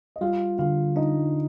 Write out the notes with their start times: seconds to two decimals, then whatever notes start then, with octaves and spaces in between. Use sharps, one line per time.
0.16 D#5
0.21 G3 F4 F5
0.59 D3 F4 F5
0.96 D4 D#4 D#5